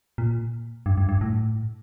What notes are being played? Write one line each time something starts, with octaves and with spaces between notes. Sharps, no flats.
A#2
G2
G2
G2
A2